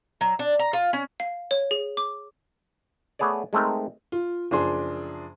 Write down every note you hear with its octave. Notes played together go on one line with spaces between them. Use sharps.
F#3
D4
A#5
F4
C#4
F5
C#5
G#4
D6
A3 B3 G#4 C#5 D5
G#3 A3 C4 D#4 A#4
F4
F#1 F3 D4 G#4 C6